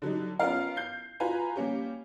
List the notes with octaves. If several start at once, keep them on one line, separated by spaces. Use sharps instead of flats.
D3 F#3 G3 D#4
B3 C#4 F4 A#4 F5
G6 C7
F4 F#4 B4 G#5 A#5
G3 A#3 C#4 G4